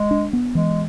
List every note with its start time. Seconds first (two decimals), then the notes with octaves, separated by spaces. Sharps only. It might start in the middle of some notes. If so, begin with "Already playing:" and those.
Already playing: G#3
0.11 D4
0.33 B3
0.54 E3 G#3